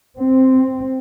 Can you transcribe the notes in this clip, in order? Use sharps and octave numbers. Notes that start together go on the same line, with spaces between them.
C4